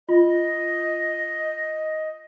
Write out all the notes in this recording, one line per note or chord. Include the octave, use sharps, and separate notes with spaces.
F4 D#5